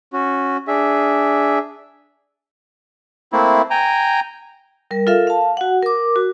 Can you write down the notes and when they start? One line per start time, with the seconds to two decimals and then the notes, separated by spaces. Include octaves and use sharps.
0.13 C#4 F#4
0.68 D4 G#4 E5
3.33 A3 A#3 C4 E4
3.71 G5 G#5 A#5
4.91 G3 A#4
5.07 F4 A4 A#4 E5 F5
5.27 F5 A5
5.57 F#4 F#5
5.83 A#4 D6
6.16 F#4